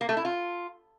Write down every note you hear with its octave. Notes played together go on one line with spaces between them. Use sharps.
A#3
A3
E4
F4